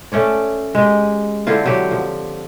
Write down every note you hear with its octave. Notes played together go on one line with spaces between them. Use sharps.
A3 C#4 C#5 D5
G#3 G4
D3 C4 E4 F4
F#3 G4
F3